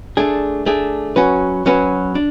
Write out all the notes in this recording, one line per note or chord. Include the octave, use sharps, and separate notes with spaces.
A3 D4 G#4
A3 D4 G#4
F#3 C#4 F#4 B4
F#3 C#4 F#4 B4
D4